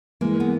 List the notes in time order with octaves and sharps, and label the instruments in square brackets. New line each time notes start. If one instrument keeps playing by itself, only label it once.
[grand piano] E3 [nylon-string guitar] G#3 A#3
[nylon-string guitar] B3